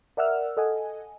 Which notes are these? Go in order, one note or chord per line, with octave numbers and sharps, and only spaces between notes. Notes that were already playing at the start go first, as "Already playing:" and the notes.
A#4 D5 E5 F#5 E6 F6
A4 D#5 F#5 G#5